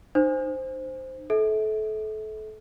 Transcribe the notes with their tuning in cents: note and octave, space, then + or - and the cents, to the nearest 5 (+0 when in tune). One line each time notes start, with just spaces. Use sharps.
D#4 -35 C5 +0
A4 -30 E5 -30